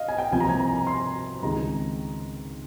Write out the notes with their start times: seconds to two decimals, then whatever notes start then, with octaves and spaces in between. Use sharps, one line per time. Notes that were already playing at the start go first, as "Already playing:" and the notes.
Already playing: D#5 F5
0.08 G#5
0.18 G5
0.31 C2 C3 F3 A#3 G#5
0.40 A#5
0.49 G#5
0.60 A#5
0.76 A#5
0.87 C6
1.42 C#2 C3 D#3 G#3 A#5